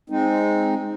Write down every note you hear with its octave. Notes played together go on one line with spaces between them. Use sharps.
G#3 C4 D#4